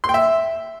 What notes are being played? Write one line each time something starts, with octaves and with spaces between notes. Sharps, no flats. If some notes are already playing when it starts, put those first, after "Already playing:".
C6
G5
E5